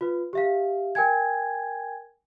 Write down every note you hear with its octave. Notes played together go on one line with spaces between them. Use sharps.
F4 B4
G4 E5 F5
A#4 G5 G#5 G#6